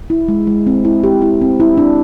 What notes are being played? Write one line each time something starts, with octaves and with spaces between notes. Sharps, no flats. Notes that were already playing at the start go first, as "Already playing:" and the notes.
E4
G#3
G#3
C4
E4
G4
E4
C4
E4
D4